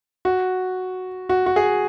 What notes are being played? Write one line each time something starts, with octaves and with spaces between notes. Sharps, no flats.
F#4
F#4
F#4
G#4